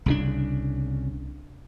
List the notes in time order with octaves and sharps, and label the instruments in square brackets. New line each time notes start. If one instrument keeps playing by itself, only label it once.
[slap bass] C2 C#3 D4